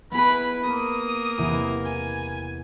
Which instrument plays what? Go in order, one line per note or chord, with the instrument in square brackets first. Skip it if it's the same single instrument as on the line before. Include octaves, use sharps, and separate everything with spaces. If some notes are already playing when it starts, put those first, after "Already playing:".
[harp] B3 G#4 [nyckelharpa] E4 B4 [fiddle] B5
[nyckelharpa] A#3 A#4 [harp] B4 [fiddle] D#6
[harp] E2 C3 E3
[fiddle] G#5